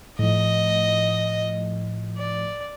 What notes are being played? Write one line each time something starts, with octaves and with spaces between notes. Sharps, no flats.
A2 F3 D#5
D5